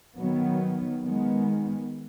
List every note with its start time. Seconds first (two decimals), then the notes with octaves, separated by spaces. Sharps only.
0.17 D#3 F#3 B3
1.04 D#3 G#3 B3